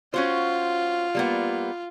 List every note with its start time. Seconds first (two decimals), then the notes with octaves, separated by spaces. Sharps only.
0.14 C#4 F4 F#4 C5
1.15 G3 A#3 B3